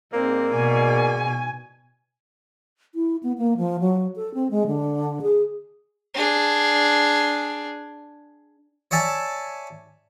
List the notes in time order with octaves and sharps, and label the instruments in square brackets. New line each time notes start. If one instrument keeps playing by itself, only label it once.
[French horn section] G#2 D5 [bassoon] A#3 [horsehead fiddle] C4
[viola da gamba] B2 [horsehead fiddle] G#5
[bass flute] E4
B3
A#3
F3
F#3
A4
C4
G#3
D3
G#4
[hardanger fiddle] D4 G#4
[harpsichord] C#5 D5 E5 G#5 A5